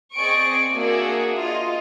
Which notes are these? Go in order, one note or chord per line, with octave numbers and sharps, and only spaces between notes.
C4 G#4 D5 D#5 C#6 D7
A#3 D4 F#4 G#4 D5 E5
F4 D#5